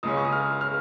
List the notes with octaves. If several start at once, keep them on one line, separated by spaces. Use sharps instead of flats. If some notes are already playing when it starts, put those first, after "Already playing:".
C#2 C#3 G#3 C#4 D#6
C#6
D#6
F6
F6